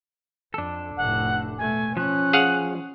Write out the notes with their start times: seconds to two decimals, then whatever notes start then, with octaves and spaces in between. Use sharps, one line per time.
0.54 F2 D4 A4
0.97 F1 A2 F#5
1.58 B2 A3 G#5
1.97 F3 C#4 F#6
2.33 G#4 F5 F#5